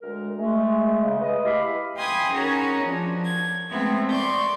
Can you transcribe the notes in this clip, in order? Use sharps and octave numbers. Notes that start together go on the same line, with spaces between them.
D2 G#3 A#4
G#3 A3
C#3
B4 D#5
E4 G4 F5 B5
G5 G#5 B5 C6 D#6 G#6
C#4 D#4 F#4 G#4 A#4 C#5
F3 D4
G#6
G#3 A3 B3 C4 E5
D5 C6 C#6 G6